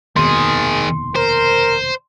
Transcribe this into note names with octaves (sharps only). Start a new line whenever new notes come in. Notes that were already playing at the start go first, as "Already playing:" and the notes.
F1 D#2 B2 D#3 G#4 C6
A#4 C5